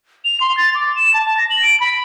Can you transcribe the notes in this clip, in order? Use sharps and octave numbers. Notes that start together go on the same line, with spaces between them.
F7
C6
A6
D6
E7
A5
A#6
F#7
D7
B5